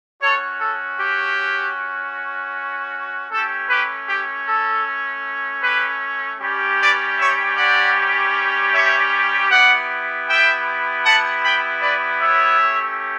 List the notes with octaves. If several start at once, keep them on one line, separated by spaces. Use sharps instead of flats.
C#4 F#4 A4 C#5
A4
G4
A3 C#4 G4 A4
G4 B4
G4
A4
G4 B4
G3 C#4 G4
B4 D5
C#5 E5
D5 F#5
C#5 E5
B3 E4 G4 D5 F#5
E5 G5
F#5 A5
G5 B5
B4 D5
C#5 E5
A3 C#4 G4